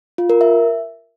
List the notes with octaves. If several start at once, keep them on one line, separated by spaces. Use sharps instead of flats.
F4
A#4
E5